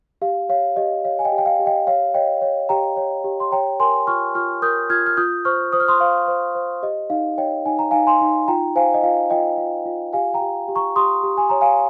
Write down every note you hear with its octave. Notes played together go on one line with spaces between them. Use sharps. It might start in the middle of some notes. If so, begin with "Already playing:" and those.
G4 F5
C#5 F5
G4 D#5
C#5 F5
G#5
D#5 G5
G4
G5
F5
G4
D#5 G5
C#5 F5
C#5 D#5 G5
C#5
G4 G5 A#5
C#5
G4
C6
C#5 G5 A#5
A#4 G#5 C6
F4 C#6 F6
F4 C#6 F6
A#4 D#6 G6
F4 F6 G#6
F6
F4 D#6 G6
C5 C#6 F6
C5 D#6
F6
C6 D#6
C5 F5
C5
C5
G4 D#5
D#4 F5
C#5 D#5 G5
D#4 G#5
A#5
D#4 F5 G#5
G#5 C6
D#4
F4 G5 A#5
C5 F5 G#5
D#5
F4 F5
F4 D#5 G5
F4
F4
G4 F5 G#5
G5 A#5
G4
G4
A#5 C#6
G4 C6 D#6
G4
G#5
C#5 A#5
F5 G#5